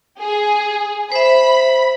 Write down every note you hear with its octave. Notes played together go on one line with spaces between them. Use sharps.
G#4
C5 E5 B5